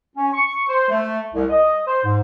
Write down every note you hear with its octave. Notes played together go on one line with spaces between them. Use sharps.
C#4
C#6
C5
A3
C2
D#5
C5
G#2